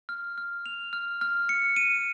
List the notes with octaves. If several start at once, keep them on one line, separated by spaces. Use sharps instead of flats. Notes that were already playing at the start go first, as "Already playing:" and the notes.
F6
F6
F7
F6
F6
C#7
D#7